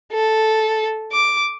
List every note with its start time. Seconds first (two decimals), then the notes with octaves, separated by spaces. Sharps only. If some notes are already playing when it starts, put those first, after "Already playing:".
0.13 A4
1.13 D6